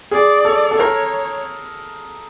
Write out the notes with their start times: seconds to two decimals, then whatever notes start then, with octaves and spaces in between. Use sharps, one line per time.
0.11 G#4 D5
0.45 A4
0.71 A4
0.79 A#4 C#5